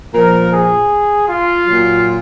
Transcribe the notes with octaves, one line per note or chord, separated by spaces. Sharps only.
A#2 F3 A#4
G#4
F4
A#2 F#3